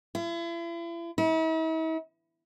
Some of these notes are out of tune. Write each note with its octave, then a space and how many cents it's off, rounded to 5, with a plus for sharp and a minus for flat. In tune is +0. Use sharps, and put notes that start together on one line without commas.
E4 +40
E4 -45